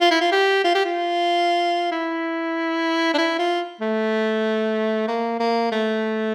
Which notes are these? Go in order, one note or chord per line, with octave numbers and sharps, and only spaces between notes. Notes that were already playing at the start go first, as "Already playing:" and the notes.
F4
E4
F4
G4
F4
G4
F4
E4
D4
E4
F4
A3
A#3
A#3
A3